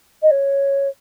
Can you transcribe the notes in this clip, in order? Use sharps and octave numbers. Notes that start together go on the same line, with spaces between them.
D#5
C#5